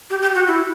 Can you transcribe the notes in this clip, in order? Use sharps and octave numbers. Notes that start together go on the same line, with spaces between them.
G4
G4
F#4
E4